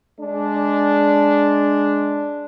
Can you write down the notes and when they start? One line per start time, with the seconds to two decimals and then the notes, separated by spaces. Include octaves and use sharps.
0.19 G#3 D4